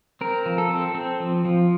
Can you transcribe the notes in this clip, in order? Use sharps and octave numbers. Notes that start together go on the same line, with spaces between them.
C4 A#4
F3
A4
C4
C4
F3
F3